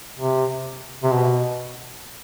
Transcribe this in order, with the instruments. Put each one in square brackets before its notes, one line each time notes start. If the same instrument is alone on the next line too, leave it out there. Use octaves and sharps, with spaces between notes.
[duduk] C3
C3
B2